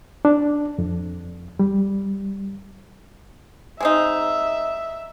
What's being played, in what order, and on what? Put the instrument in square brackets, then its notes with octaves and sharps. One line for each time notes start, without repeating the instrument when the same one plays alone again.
[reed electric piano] D4
F2
G3
[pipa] G#3 C4 D#4 [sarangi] E5